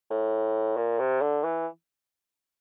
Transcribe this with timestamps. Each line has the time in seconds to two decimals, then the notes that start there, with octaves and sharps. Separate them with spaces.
0.10 A2
0.77 A#2
0.99 C3
1.21 D3
1.43 E3